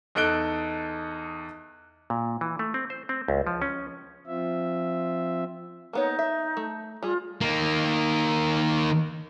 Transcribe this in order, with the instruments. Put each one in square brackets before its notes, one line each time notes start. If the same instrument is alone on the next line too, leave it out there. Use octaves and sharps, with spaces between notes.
[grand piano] E2 D#4 A4 F#6 D7 G7
[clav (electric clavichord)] A#2
E3
A3
C4
C5
C4
C#2
F3
C#4
[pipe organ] F3 C4 F4 E5
[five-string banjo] A#3 B3 C#5 [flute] D#4
[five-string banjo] E5
A3
[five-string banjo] G3 G#4 [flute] F4
[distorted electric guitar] D#3 A#3